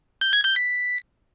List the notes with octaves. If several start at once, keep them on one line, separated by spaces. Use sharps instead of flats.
G6
G#6
G6
B6